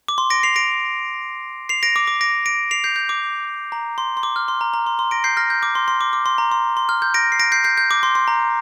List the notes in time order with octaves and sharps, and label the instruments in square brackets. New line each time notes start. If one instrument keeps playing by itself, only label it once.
[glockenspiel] D6
C6
A#6 D7
C7 F7
A#6 D7
C7 F7
A#6 D7
D6
D6
A#6 D7
A#6 D7
C7 F7
G6 C7
G6
D6
A#5
C6
C6
D6
F6
C6
A#5
A#5
C6
C6
A#6 D7
G6 C7
F6 A#6
G6
D6
C6
C6
D6
D6
C6
A#5
C6
C6
F6
G6
A#6 D7
C7
A#6 D7
G6 C7
G6 C7
G6
D6
C6
C6
A#5